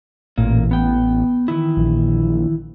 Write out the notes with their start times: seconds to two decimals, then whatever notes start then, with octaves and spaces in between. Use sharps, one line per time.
0.38 A1 A#2 A#3
0.71 B3 G5
1.48 D#3 E3 E4
1.77 A#1